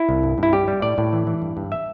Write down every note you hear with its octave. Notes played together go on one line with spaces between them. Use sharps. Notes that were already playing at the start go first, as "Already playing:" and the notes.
Already playing: E4
C2
G2
G2 E4
G3 G4
G3
A2 D5
A2
E3
E3
G2
G2
E5